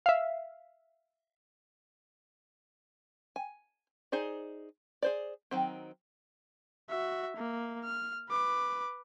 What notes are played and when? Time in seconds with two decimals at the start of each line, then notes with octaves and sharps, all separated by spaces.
0.06 E5 F5
3.36 G#5
4.12 D#4 G#4 C5 D5
5.02 G#4 C5 D5
5.51 D#3 F#3 C4
6.90 F#4 E5
7.36 A#3
7.84 F6
8.29 B4 D6